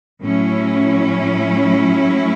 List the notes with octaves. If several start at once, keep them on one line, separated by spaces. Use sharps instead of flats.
A2 F#3 C#4 E4